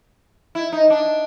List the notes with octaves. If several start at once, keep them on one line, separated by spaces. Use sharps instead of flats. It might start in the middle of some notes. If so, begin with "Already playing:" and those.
E4
D#4
D4